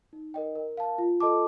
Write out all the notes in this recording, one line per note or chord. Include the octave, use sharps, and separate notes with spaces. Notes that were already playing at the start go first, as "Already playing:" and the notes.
D#4
A#4 D#5 G5
A#4
F5 A5
F4
A4 D#5 A5 D6